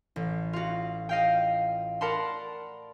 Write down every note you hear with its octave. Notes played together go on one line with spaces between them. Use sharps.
A1
F4 F#4
D#5 F5 G5
A#4 D5 F#5 A5 B5 C6